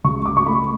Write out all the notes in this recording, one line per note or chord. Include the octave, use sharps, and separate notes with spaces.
C#2 C#6
D6
C#6
A3 B5